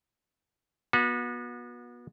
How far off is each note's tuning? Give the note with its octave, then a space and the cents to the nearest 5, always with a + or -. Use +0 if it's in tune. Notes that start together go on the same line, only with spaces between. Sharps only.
B3 -30 F#4 -35